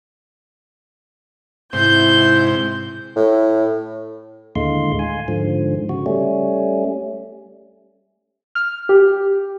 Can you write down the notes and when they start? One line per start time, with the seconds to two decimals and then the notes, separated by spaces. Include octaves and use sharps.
1.73 G#2 C3 E4 C5 G6
3.16 A2
4.56 D#2 A2 D3 G#3 F5 C6
4.99 F5 G#5
5.28 G#2 D3 F3
5.89 C#3 F#4
6.06 G3 A3 C#4
8.55 F6
8.89 G4